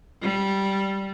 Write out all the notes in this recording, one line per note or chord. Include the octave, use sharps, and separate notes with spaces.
G3